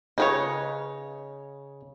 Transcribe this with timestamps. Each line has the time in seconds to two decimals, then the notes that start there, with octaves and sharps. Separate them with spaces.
0.18 C#3 D#4 B4 C#5